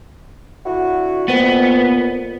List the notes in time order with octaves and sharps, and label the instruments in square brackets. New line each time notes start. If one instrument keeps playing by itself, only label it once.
[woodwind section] D3 E4 F#4
[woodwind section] F2 [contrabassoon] A#2 [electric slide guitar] B3